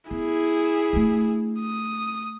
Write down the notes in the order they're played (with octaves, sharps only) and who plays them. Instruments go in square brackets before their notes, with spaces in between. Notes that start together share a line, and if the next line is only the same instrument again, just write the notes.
[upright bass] B3 [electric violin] E4 G#4
[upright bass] A3 D4
[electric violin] D#6